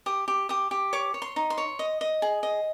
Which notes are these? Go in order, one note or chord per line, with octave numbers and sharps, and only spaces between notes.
G4 D#6
G4
G4 D#6
G4
C#5 D6
C#5
C6
D#4
C6
C#5
D#5
D#5
G#4
D#5